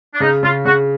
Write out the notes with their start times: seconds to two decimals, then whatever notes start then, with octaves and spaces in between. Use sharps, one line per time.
0.14 D4
0.20 C#3 D#4
0.43 C#3 F4
0.65 C#3 F#4